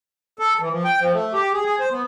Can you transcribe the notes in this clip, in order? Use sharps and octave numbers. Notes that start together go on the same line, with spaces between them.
A4
E3
F3
G5
F3
A3
G4
G#4
G#4
C5
B3